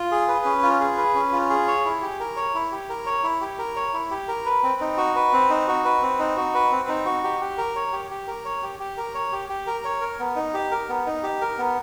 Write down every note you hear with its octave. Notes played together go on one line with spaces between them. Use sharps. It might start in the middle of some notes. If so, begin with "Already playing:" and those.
Already playing: F4
G#4
B4
C#4
F4
G#4
B4
C#4
F4
G#4
C#5
E4
G4
A#4
C#5
E4
G4
A#4
C#5
E4
G4
A#4
C#5
E4
G4
A#4
B4
C4
D#4
F#4
B4
C4
D#4
F#4
B4
C4
D#4
F#4
B4
C4
D#4
F#4
G4
G4
A#4
C#5
G4
G4
A#4
C#5
G4
G4
A#4
C#5
G4
G4
A#4
C#5
A#4
B3
D#4
G4
A#4
B3
D#4
G4
A#4
B3